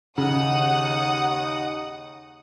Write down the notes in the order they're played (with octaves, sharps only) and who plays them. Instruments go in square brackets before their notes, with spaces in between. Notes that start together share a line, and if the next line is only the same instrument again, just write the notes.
[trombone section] D#2 D#4 [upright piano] C#3 [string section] F#5 D#6